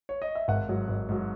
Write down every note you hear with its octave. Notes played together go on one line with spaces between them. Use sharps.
C#5
D#5
E5
G#1 F#5
G#2 F#3
G#1
G#2 F#3